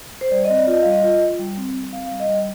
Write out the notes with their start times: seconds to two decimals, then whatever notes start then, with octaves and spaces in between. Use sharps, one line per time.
0.21 C5
0.31 G3 D5
0.45 D#5
0.50 C4
0.58 D5
0.67 F4 D#5
0.82 G3 F5
0.92 D#5
1.03 F4
1.21 F4
1.39 G3
1.57 C4
1.74 G3
1.92 C4 F5
2.06 F5
2.11 G3
2.20 D#5
2.29 G3